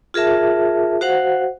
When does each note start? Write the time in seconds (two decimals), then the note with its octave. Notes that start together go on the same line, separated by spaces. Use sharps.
0.14 F4 G#4 A#4 E5 A5
1.01 F#4 C5 F5 F#5